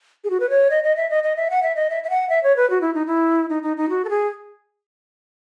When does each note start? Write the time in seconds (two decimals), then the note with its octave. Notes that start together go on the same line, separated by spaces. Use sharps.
0.24 G#4
0.30 F#4
0.40 B4
0.50 C#5
0.70 D#5
0.84 D#5
0.97 E5
1.10 D#5
1.24 D#5
1.36 E5
1.50 F#5
1.63 E5
1.76 D#5
1.90 E5
2.03 E5
2.10 F#5
2.30 E5
2.44 C#5
2.56 B4
2.70 F#4
2.81 E4
2.94 D#4
3.06 E4
3.49 D#4
3.63 D#4
3.77 D#4
3.89 F#4
4.05 A4
4.10 G#4